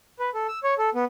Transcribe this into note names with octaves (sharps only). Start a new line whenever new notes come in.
B4
A4
E6
C#5
A4
B3